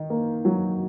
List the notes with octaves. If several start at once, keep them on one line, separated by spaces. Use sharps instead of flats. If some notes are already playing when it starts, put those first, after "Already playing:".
Already playing: D#3 D#4
A#3
F#3